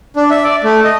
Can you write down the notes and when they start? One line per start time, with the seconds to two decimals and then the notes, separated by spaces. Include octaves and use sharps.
0.16 D4
0.30 E5
0.44 D5
0.64 A3
0.84 D#5